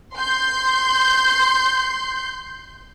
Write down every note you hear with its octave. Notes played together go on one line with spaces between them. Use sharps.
C6 G6